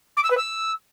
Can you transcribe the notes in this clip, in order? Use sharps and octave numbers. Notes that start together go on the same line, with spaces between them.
D6
E6
B4
E6